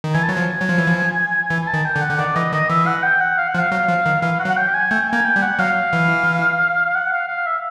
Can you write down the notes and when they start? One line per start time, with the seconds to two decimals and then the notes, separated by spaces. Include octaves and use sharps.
0.04 D#3
0.14 E3 G#5
0.23 A5
0.29 F#3
0.33 F3 G#5
0.60 F#3
0.69 F3
0.78 E3
0.87 F3
1.50 E3
1.62 G#5
1.67 A5
1.73 D#3
1.85 G5
1.96 D3
2.01 F#5
2.10 D3
2.19 D#3 D5
2.35 E3 D#5
2.52 D#3 D#5
2.70 E3 E5
2.86 F#5
3.03 G5
3.21 F#5
3.38 F5
3.48 F#5
3.55 F3
3.59 F5
3.72 F#3
3.88 F3
4.06 D#3
4.22 E3 F5
4.39 F#5
4.45 F#3
4.50 F#5
4.57 G5
4.67 G5
4.74 G#5
4.91 A3 G5
5.08 A#3 G#5
5.25 G5
5.36 G3
5.42 F#5
5.59 F#3 F5
5.93 E3
6.95 F#5
7.12 F5
7.28 F5
7.46 E5